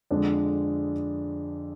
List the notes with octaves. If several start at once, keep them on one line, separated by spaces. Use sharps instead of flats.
F2 D3 G#3 D4